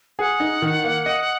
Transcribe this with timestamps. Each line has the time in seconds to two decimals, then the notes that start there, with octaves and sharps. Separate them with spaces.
0.19 G#4 F#5
0.40 D#4
0.62 D#3
0.84 A#3
1.06 D#5